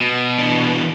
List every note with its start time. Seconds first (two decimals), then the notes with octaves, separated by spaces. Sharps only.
0.01 B2
0.39 E3 D4